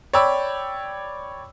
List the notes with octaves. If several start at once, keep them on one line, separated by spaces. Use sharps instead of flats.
C#5 D5 G5 B5 E6